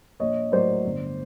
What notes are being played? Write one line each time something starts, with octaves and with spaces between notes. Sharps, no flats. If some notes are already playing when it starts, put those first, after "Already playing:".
A#1 C#5 D#5
A2 F#3 A#3 C5 D5
G1